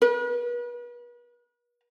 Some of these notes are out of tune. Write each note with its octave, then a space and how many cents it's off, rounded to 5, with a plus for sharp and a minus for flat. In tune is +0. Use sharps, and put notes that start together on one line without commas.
B4 -40